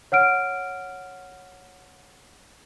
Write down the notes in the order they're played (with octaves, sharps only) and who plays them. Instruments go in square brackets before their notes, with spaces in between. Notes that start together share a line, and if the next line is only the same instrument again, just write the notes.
[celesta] C#5 F#5 F6 D7